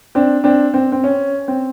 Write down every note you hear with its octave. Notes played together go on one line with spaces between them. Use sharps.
C4 D4
C4 D4
C4
C4
C#4
C4